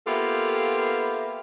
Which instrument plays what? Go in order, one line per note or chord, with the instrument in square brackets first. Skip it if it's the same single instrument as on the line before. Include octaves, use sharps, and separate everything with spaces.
[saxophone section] A#3 B3 F4 G4 A4 E5